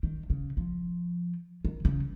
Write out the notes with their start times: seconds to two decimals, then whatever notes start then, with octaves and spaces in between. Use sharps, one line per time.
0.03 D#3
0.30 C#3
0.57 F3
1.65 D#3
1.85 C#3